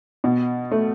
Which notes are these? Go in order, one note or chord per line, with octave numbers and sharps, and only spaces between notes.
B2
A3